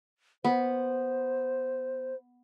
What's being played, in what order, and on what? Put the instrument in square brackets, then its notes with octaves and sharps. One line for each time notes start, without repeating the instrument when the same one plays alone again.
[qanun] B3 [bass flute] C5